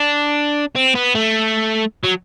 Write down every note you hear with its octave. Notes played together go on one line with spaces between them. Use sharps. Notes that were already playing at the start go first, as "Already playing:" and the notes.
Already playing: D4
C4
B3
A3
F#3